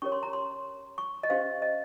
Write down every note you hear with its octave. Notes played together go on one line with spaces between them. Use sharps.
C#4 G4 A#4 C#5 C#6
C6
A#5
C6
C#6
D#5
C#4 G4 C5 F5
D#5